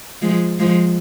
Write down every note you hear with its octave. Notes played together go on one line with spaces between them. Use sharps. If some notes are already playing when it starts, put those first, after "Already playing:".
F3 G#3
F3 G#3